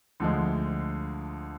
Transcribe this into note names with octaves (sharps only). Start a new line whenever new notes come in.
D2 D3 F3 G#3